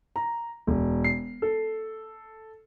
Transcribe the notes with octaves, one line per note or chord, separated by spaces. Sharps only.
A#5
E1
C7
A4